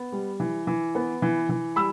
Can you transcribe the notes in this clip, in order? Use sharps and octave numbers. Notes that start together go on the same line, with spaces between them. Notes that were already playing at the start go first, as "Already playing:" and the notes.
Already playing: B3
G3
E3
E3
B3
E3
E3
G3 B5 E6